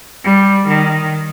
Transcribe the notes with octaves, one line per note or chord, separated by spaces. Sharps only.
G3
D#3